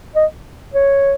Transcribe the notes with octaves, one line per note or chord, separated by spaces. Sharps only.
D#5
C#5